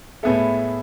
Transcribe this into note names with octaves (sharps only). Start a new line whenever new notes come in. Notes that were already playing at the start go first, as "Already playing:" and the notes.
A2 G#3 B3 E4 A4